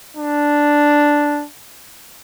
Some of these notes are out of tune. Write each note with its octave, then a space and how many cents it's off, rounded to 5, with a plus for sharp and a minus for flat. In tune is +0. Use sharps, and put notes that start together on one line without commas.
D4 +0